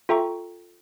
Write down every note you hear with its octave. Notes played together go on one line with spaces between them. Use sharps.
F4 A4 E5 G5 A#5 C#6